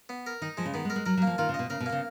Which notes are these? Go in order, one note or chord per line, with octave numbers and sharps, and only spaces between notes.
B3
A#4
D#3 D#4
F3 G#3
C#3
D#3 B3
G#3
A#4
G#3
F#3 A#4
F#3
A#3
F3
D#3 F4
C#3
B2 D#5
C#3 A#4
B2
A#3
C#3